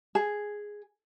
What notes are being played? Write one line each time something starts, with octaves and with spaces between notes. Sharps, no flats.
G#4